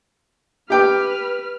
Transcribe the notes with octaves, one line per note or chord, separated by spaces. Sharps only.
G4 B4 G5 D6 F6